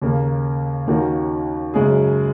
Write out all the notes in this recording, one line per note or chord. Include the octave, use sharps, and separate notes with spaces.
D#2 C#3 A#3
D#2 D#3 A#3 C#4 F#4
F#2 C#3 G#3 C#4 G#4